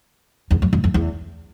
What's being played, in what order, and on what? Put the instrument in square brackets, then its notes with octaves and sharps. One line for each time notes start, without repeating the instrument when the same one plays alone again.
[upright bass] E2
F#2
F#2
F2
E2